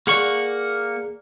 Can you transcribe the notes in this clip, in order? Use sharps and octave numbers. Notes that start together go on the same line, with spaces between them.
A#3 G#4 D5 F#5 C#6